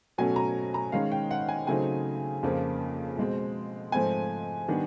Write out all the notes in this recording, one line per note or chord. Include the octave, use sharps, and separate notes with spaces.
B2 F#3 A3 C#4 G#5
A#5
A#5
D#3 G#3 C#4 F5
G5
F#5
G#5
C#3 F#3 A3 C4 D#4 G#5
F2 C#3 F3 A#3
B2 G#3 C4
G#2 F3 A3 C4 G#5
D#3 G3 B3 D4